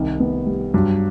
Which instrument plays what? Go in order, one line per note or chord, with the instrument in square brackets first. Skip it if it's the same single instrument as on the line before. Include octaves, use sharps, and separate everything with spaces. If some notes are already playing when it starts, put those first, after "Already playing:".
Already playing: [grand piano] C2 C3 [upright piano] D#3
[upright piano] B3
G3
[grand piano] G2 [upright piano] F#3